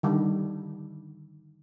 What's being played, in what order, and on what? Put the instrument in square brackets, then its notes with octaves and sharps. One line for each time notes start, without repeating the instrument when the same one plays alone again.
[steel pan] D3 D#3 G3